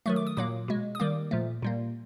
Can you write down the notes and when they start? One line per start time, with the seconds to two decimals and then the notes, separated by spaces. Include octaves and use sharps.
0.06 D#3 F#3 A3 C#6
0.16 D6
0.27 D#6
0.37 A#2 F#3 A#3 D6
0.68 B2 G#3
0.95 D#6
1.00 D#3 G3 A#3 D6
1.31 A#2 F3 A3
1.62 A#2 G3 A#3